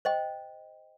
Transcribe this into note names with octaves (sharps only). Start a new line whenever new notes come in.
C5 D#5 G5